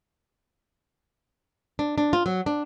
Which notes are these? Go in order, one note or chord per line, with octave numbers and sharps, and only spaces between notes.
D4
D4
F4
F#3
D4